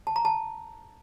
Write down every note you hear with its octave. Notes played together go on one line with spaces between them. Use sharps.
A5
A#5
A5